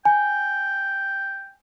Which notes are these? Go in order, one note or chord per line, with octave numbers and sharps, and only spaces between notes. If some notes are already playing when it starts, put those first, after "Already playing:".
G5 G#5